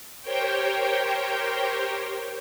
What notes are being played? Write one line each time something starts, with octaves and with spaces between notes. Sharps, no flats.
G4 A#4 C5 C#5 G5